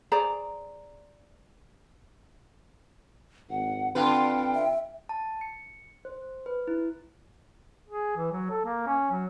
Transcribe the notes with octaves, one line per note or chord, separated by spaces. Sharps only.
G#4 C5 D5 A#5
G#1 F#5
D3 C4 F4 B4 G5
E5
A5
C#7
C5
B4
E4
G#4
E3
F#3
A4
A#3
C#4
F#3